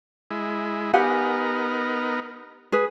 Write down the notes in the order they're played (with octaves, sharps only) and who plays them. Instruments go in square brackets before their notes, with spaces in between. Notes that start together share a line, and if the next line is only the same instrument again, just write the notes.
[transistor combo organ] G#3 E4
[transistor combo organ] B3 D#4 A#4 [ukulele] G4 F#5 G#5
[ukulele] G#4 B4